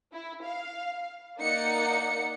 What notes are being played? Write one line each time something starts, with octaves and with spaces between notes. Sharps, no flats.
E4
F5
A#3 D#4 D5 F#5 C#7